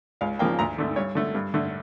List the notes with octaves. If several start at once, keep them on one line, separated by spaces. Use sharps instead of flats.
C#2 F5
C#3 F3 A#3 G5
D2 A#5
D3 A3
G2 C#5
D3 A3
G2
D3 A3